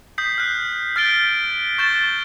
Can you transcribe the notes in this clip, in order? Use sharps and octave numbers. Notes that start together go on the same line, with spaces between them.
D#6 G6 B6 C7
F6 F#6
F6 G6 A6 B6 D7 G7
C#6 G6 A6 E7 G7